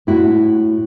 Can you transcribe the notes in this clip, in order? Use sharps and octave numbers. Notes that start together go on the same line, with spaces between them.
A2 E4 F#4